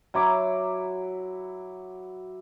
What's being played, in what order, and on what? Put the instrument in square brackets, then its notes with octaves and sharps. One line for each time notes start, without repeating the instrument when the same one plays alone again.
[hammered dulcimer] F#3 E4 D6